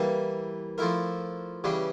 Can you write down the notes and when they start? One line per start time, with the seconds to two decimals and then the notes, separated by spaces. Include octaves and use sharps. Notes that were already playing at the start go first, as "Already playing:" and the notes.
Already playing: E3 G3 A#3
0.78 F3 A3 E4 A#4
1.64 C#3 E3 G3 D4